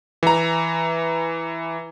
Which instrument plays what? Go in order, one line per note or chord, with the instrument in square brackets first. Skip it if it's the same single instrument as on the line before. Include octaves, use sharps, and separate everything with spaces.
[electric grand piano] E3 A#5